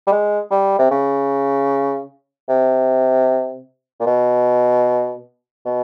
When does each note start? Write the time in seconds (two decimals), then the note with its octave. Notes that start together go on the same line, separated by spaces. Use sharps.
0.07 G3
0.12 G#3
0.51 G3
0.79 C3
0.91 C#3
2.49 C3
4.00 A#2
4.06 B2
5.66 B2